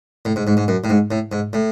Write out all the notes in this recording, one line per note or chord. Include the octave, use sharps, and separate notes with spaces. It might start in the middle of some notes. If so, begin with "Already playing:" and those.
A2
G#2
G#2
G#2
F#2
A2
G#2
A2
G#2
A2